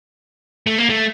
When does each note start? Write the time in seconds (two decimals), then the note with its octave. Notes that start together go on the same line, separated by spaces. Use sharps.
0.67 A3
0.78 A#3
0.90 A3